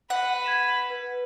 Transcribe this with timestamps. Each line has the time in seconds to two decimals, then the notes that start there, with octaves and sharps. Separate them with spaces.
0.10 B4 F#5
0.44 G#6 B6 E7
0.90 B4